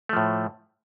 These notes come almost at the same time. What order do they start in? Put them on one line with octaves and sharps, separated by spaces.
A3 F3 A2